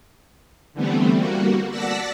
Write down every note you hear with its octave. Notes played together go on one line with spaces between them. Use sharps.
D3 E3 G3 A3 B3 C4
G3 A#3 F#4
D5 F#5 A5 E6 A#6 B6